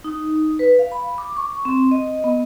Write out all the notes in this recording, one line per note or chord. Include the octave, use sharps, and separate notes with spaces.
D#4
B4
F5
B5
D6
C#6
C4
D#5
B3